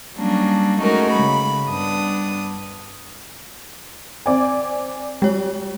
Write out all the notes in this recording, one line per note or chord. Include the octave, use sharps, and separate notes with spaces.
F#3 G3 A#3 C#4 D4
G#3 A3 C#4 D#4 F#4 A#4
C#3 B5
G2 B3 D4 D#6
C4 D5 G#5
G3 G#3 C#5